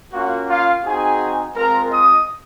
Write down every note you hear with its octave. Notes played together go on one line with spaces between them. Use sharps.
A#3 C#4 F4 F#4 F#5
F4 F5
C4 D#4 F#4 G#4 G#5
G#3 C4 F4 A#4 A#5
D#5 D#6